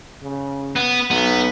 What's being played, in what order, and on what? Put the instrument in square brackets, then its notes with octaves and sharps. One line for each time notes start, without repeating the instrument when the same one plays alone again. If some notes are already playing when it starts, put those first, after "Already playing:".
[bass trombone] C#3
[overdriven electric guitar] B3
[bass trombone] B1 [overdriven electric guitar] B3